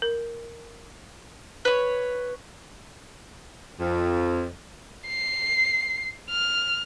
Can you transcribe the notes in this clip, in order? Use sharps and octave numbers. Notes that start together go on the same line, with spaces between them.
A#4
B4 C#5
F2
C7
F6